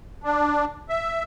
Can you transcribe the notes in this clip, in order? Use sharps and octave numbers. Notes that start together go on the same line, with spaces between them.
D4
E5